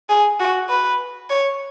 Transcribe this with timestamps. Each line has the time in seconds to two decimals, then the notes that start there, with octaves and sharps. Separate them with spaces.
0.09 G#4
0.40 F#4
0.69 B4
1.30 C#5